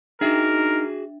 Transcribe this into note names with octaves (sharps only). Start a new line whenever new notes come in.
D4 D#4 F#4 G#4 A#4 E5